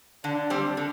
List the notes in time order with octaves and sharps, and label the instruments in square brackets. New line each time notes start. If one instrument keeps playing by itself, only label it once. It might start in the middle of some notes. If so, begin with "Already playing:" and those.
[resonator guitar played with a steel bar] D3 [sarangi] D4
[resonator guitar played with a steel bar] G3 C4
D3